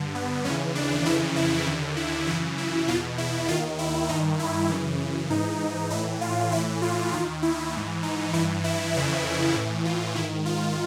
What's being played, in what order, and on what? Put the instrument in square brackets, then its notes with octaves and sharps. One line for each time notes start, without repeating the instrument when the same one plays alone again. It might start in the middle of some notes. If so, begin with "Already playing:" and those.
Already playing: [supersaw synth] G2 D3
B3
D#2 C#3 E3 C#4
D4
F2 C#3 E3 E4
E4
D#2 D3
E4
F#2 C#3 E3 E4
E4
E2 B2 F4
E4
D#2 D#3 F4
E4
G2 D#3 D#4
E4
F#2 C#3 E3
G#2 E3 D#4
A2 E3 E4
F4
A2 E3 E4
F4
D#2 D#3 F4
E4
G#2 E3
D#4
G2 E3 E4
E4
F2 C#3 E3 E4
A2 E3
F4
G#2 D#3 E4
F4